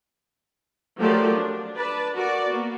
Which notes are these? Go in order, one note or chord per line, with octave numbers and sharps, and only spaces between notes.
F3 F#3 A3 G4 A#4 D5
D4
B4 D5 A5
F#4 A#4 D5
A#3 B3 F#4